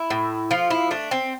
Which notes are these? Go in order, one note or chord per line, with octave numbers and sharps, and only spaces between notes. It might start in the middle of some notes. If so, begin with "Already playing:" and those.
Already playing: E4
A2
F3 F4
E4
A3 D4
C4